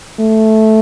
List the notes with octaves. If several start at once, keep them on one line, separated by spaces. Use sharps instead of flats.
A3